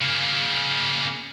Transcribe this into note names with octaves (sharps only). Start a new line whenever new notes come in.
C#3 A#3